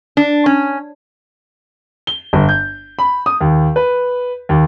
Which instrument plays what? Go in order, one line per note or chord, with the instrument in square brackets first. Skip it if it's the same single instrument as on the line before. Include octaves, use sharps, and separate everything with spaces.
[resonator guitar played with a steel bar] D4
C#4
[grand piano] G7
G1
G6
B5
D#6
D#2
B4
D#2